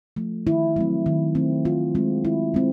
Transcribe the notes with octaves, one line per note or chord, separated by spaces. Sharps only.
F3 A3
D#3 E4
F#3 A3 C4
D#3
F#3 A3 C4
D#3 F4
G#3 C4
D#3 E4
G#3 C4